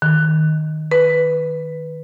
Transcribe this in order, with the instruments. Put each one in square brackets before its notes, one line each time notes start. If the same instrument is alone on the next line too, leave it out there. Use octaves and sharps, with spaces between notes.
[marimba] D#3
B4